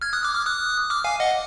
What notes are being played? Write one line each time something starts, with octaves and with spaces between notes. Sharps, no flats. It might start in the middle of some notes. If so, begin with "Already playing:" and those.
F6 G#6
D#6 F#6
D6 F6
D6 F6
D#6 F#6
D6 F6
F5 G#5
D#5 F#5